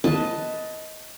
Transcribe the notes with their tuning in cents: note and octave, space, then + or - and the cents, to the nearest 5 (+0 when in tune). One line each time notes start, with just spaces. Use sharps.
B4 +0 D#5 +15 A5 +0